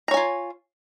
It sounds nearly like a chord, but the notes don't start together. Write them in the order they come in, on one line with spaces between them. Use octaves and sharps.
A#5 C#5 G#5 F4